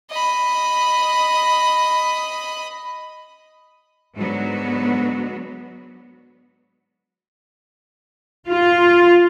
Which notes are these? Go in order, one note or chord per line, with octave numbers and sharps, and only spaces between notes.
D#5 B5
G#2 D3 F#3 B3 F#4
F4